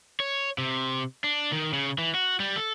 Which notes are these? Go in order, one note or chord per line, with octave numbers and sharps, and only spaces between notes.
C#5
C3
D4
D#3
C#3
E3
F#4
G3
A4